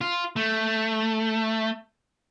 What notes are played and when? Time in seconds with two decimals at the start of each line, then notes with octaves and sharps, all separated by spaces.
0.01 F4
0.36 A3